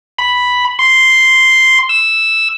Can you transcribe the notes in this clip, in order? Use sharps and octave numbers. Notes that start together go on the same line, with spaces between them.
B5
C6
E6